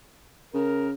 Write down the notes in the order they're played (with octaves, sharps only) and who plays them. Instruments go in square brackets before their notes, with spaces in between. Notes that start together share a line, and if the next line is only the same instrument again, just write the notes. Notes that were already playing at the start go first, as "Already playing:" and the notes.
[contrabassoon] C#3 [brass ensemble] A#4